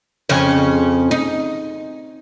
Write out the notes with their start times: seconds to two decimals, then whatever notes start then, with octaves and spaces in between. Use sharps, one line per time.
0.29 F2 C#3 C#4
1.11 D#4